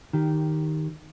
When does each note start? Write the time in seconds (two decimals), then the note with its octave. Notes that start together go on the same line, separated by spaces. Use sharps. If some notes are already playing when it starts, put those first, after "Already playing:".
0.13 D#3 G4